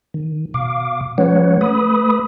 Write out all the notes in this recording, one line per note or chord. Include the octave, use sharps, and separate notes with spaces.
D#3
B2 F5 D6
F3 G#3 C#4 B4 C#5 F#5
A3 B4 B5 D#6